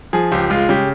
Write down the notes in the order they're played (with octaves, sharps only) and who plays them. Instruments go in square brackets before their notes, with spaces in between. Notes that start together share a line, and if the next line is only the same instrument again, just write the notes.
[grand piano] F3 G#4
C#2 G4
G#3 F4
C#3 G4